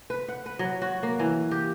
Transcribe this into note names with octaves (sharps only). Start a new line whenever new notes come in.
B4
F#5
B4
F#3
F#4
A#3
E3
G4